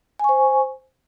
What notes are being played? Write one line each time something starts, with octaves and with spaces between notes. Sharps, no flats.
C5 G#5 C#6